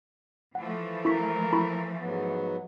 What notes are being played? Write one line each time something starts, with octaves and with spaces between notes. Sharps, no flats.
E3 F3 A3 F#5
E4 A#4 C#6 B6
E4 B5 C#6
G#2 F#3 B3